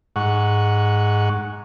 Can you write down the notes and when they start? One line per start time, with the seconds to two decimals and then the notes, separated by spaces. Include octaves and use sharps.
0.16 G#2 F#5 C#6